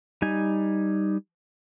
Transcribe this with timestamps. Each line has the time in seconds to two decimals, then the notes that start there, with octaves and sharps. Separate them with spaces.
0.22 G3 D#4 G#5